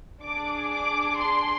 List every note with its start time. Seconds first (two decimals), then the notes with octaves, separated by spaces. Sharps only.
0.23 D4 G#4 D6
0.71 D6
1.18 C6